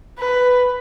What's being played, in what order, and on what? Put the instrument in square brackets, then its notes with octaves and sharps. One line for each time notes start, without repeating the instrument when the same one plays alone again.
[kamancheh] B4